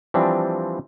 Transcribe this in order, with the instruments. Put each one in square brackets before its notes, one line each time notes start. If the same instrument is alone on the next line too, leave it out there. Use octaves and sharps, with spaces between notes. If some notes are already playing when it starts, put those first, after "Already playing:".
[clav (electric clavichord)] E3 F3 G3 C4 D4